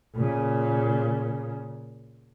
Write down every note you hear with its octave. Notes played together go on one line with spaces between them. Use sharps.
A#2 C#3